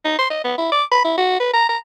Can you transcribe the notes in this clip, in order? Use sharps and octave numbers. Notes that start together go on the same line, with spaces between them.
D#4
C6
D#5
B3
E4
D6
B5
E4
F#4
B4
A#5
A#5